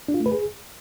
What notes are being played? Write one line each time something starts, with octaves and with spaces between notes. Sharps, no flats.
D4
F4
A3
B4
G#4